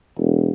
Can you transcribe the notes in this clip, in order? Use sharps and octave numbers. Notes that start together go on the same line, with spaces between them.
E1